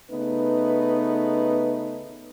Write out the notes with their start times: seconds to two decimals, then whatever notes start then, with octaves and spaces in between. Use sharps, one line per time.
0.11 C#3 A3 B3 D#4 B4